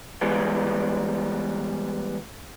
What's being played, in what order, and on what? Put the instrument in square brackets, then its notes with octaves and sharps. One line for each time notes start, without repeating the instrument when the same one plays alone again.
[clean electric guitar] E3 G3 G#3 B3